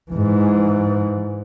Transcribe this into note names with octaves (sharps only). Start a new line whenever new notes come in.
G#2 E3